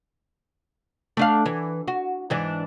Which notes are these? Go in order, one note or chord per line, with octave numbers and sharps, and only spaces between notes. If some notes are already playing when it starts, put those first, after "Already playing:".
A3 D4 F5
E3
F#4
G#2 E3 D4